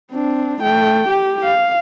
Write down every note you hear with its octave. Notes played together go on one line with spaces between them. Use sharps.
C4 D4
A3 G5
G4
F5